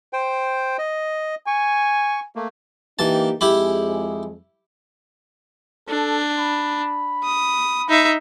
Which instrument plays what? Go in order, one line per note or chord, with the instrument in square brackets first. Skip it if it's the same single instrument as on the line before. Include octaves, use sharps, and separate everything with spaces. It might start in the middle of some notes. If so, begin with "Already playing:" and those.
[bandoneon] C5 G5
D#5
[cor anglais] G#5 [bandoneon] C#6
[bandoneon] A3 A#3
[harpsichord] E3 A5 [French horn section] A#3 D#4 G4
[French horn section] F2 G#3 G#4 [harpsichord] E4 G4 B5
[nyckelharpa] D4 [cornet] A4
[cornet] B5
[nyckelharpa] D#6
D#4 E5